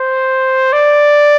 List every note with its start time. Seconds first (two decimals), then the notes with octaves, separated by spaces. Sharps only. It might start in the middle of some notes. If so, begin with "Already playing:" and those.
Already playing: C5
0.73 D5